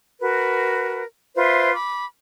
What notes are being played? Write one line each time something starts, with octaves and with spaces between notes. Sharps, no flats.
F#4 A#4 B4
F4 B4 C5 E5
B5 D6